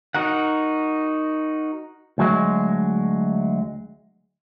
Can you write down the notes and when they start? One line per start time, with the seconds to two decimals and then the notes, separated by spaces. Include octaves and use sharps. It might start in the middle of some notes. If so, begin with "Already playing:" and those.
0.15 D#4 F#4 A#4 F#5
2.18 D2 F#3 G#3